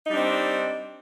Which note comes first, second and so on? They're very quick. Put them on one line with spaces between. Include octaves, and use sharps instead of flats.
D#4 G3 D4 C4